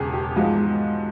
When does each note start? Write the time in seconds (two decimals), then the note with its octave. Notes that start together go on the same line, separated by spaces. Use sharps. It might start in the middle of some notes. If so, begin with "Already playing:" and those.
Already playing: E1 E2 C#3 G4 G#4
0.14 G4
0.36 G#2 F3 G#3 F#4